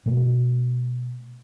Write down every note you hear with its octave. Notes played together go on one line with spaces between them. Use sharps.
B2 A3